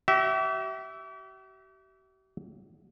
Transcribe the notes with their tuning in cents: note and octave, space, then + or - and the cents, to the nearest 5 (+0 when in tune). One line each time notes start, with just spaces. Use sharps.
G4 -45 E5 -5